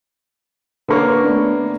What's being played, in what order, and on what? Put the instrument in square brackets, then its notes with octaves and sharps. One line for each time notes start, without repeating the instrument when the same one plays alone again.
[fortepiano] D3 A#3 C#5 [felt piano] B4 C#6
[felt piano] A3 B3 D4